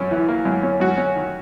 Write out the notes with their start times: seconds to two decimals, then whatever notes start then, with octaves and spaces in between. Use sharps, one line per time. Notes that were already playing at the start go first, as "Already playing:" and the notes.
Already playing: F#2 C#4
0.11 E3
0.28 A#3
0.45 F#2
0.63 C#4
0.80 F#2 F#4
0.98 C#4
1.16 D#3